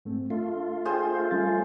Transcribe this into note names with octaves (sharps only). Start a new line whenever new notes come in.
G#2 A3 C4
A3 D4 F4
G#4 C5
G3 C#4 A6